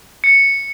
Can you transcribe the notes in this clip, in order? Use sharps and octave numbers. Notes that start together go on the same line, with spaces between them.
C#7